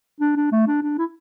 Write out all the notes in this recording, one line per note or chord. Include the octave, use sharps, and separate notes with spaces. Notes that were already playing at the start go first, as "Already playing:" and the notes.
D4
D4
A3
D4
D4
E4